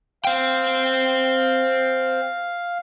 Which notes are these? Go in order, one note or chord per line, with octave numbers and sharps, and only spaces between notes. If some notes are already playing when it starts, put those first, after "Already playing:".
C5 F5 G5